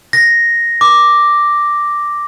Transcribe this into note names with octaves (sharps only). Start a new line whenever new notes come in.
A#6
D6